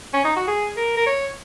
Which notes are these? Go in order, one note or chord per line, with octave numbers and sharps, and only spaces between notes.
C#4
D#4
F#4
G#4
A#4
A#4
C#5